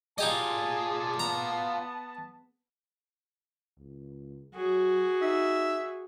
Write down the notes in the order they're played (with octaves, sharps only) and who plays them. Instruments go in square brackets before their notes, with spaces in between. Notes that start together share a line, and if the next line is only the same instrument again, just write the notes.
[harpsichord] D#4 G4 D#5 [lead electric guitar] F4 D5 [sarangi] G#4 [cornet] A5
[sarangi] B3 [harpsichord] A#5
[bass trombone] C#2
[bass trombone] F#3 [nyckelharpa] F#4 G#4
[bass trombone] D#4 [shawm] E5